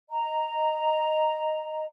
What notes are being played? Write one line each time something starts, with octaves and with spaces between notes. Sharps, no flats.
D#5 A#5